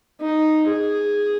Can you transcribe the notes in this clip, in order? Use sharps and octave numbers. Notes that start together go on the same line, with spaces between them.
D#4
G#4